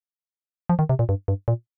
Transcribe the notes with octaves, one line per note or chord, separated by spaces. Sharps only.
F3
D#3
C3
A#2
G2
G2
A#2